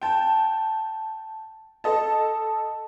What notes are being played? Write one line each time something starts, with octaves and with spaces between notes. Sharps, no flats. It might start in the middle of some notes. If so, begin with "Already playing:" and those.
G5 A5
A4 D#5 A5